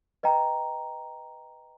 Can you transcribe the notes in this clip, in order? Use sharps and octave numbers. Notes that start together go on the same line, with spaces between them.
B4 D#5 G5 A#5